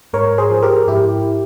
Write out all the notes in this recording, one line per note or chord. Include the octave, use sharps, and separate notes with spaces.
G#2 A#4 C#5
G#4 C5
F3
G4 A#4
G#2 E4 G4